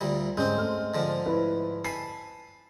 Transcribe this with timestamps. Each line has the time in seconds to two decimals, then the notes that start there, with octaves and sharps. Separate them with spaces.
0.01 D2 A#2 G3
0.37 G#2 G#3 C4 C#4 G6
0.57 A3 F6
0.94 G#2 D3 F3
1.26 E4 B4
1.84 G#5 A5 B5 C7